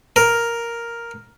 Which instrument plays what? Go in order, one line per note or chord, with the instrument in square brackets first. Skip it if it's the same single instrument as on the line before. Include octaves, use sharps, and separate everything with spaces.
[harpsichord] A#4